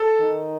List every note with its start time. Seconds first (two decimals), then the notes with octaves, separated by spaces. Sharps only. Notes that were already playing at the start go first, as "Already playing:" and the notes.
Already playing: A4
0.20 D#3